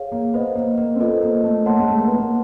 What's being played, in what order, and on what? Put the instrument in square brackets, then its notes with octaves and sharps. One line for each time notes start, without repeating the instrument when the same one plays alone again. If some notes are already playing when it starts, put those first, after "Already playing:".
Already playing: [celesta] G#4 C#5 F5
[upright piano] A#3
[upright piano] B3 [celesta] C5 D#5 F#5
[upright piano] A#3
A#3
C4
[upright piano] B3 [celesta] F4 A4 C5 D#5
[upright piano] A#3
A3
[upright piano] A#3 [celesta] C#5 F#5 A5 C6
[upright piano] A3
G#3
A3
A#3
B3
A#3